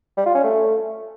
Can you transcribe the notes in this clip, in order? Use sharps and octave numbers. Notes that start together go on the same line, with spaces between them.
G3
F4
C#4
A3